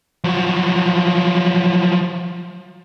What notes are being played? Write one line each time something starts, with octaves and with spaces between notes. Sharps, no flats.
F3 F#3